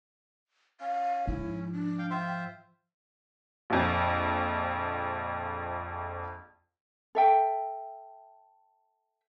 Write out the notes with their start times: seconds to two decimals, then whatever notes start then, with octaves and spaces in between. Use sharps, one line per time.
0.81 C#4 F5
1.27 G#2 F3 E4
1.73 D4
1.99 F5 G5
2.10 F4 C5 E5 G5
3.70 A#1 F2
7.15 A4 E5 G5